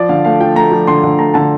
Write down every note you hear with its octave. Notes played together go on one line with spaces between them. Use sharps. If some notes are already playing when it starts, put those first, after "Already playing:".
Already playing: F3 D5
D3 F5
A3 F5
F3 G5
A3 A#5
F3
D3 C6
D3
A3 A#5
D3 A5